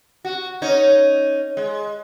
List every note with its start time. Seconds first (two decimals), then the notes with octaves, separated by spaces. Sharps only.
0.25 F#4
0.62 C#4 D#4 C#5
1.57 G#3